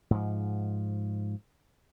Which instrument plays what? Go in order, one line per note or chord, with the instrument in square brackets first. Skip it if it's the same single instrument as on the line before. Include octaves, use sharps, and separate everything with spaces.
[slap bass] G#2 F3